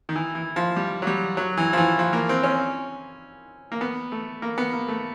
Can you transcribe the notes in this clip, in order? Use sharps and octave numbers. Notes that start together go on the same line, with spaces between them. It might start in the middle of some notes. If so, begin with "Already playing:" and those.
D#3
E3
E3
F3
G3
F#3
G3
F#3
E3
F3
E3
F3
A#3
C4
C#4
A#3
B3
A3
A#3
B3
A#3
A3